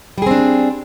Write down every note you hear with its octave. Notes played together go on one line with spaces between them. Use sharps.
G3 C4 D4 G#4